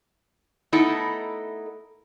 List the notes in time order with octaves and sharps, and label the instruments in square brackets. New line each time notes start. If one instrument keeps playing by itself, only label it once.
[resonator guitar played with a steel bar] A3 B3 D#4 E4 A4